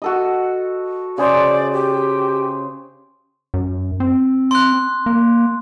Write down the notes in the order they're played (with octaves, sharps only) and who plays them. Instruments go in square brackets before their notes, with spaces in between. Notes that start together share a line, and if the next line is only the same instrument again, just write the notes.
[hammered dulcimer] F#4 A4 D#5
[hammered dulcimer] C#3 G#4 C5 [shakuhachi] D5
[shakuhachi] G4
[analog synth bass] F#2
C4
[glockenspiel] C6 F#6
[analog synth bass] A#3